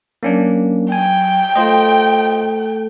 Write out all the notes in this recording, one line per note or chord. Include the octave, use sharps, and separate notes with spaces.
F#3 A#3 C#4 D4
G5 G#5
A3 F4 A4 C5 D#5